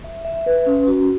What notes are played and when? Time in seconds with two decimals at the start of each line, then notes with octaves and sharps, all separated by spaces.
0.04 E5
0.25 E5
0.46 B4
0.66 C#4
0.88 F#4